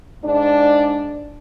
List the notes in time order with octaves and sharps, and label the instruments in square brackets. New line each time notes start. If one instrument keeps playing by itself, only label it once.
[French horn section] G#2 D4 D5